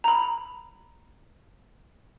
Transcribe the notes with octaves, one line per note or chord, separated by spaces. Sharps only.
A#5 B5